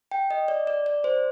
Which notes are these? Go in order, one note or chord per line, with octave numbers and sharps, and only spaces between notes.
G5
D#5
D5
D5
D5
C5